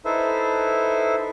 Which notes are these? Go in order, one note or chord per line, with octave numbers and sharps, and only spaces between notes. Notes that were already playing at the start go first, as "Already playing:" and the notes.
D#4 E4 A4 B4 C5 E5